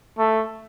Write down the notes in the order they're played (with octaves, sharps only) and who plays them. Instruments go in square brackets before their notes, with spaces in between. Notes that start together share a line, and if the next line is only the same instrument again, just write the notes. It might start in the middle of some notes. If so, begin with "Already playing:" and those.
[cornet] A3